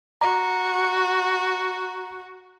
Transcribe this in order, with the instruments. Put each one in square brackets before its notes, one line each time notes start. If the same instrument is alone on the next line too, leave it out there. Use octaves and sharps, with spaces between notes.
[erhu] F#4 [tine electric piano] A#5